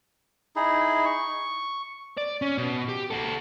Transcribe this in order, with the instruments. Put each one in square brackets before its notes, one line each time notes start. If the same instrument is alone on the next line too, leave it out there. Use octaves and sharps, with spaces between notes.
[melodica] D#4 E4 G#4
C#6
[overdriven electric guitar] D5
C#4
B2
G4
F#4 A4